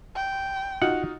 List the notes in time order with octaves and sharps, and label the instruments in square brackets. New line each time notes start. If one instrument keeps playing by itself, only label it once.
[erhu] G5
[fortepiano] D#4 F4 F#4 [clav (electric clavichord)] F#5